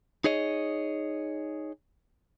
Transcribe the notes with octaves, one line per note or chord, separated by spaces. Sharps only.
D#4 G#4 C#5 D#5